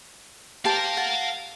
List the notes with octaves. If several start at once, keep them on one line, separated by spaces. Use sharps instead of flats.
G4 C5 F5 A5 A#5
F#5 A5